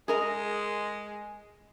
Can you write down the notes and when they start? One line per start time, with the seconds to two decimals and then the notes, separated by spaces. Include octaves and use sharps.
0.08 G#3 G#4 A#4 D#5